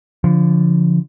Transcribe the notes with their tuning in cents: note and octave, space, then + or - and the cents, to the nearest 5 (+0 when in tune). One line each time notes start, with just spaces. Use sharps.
D3 -30 F3 -5